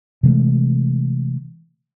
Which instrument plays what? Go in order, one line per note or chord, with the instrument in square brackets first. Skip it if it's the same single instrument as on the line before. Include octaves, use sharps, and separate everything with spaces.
[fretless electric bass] C3 E3 G#3 A3